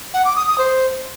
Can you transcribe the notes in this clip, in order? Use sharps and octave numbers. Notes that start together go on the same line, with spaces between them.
F#5
D6
D#6
D#6
C5